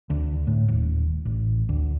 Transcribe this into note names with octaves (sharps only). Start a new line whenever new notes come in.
D2
A2
D#1
A1
D2